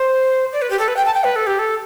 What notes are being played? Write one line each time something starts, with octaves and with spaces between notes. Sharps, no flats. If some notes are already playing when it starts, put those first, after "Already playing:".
Already playing: C5
D5
B4
G4
A4
B4
G5
A5
G5
B4
A4
G4
A4